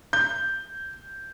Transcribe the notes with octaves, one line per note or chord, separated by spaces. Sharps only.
G6